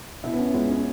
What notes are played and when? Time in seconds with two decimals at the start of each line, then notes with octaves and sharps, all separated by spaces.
0.24 B2 E4
0.33 B3
0.39 C#4
0.54 C#2 B3
0.69 C#4